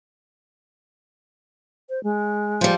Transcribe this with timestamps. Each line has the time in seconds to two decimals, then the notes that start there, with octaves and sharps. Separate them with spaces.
1.89 C5
2.03 G#3
2.61 F3 G3